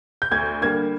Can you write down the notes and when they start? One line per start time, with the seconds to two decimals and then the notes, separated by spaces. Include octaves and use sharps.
0.22 G6
0.31 D2 G#6
0.62 D3 G3 A#3 G#6